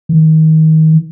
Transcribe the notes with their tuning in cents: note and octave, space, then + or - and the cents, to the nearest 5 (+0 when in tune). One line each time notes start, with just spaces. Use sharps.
D#3 +25